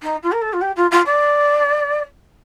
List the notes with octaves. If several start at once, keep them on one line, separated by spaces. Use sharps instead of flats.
D#4
F4
A#4
A4
F4
G4
F4
F4
D5